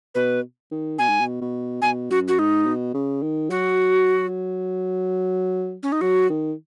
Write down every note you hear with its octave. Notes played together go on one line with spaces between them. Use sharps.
B2 B4
D#3
B2 G#5
G#2
B2
B2
B2 G#5
F#2 F#4
F#4
G#2 D#4
B2
C#3
D#3
F#3 F#4
C#4
D#4
F#3 F#4
D#3